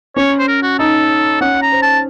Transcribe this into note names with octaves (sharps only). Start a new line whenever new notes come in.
C#4 C#5
C5
A#4
F#4
D#4 A4
C#4 F#5
A#5
C5
A5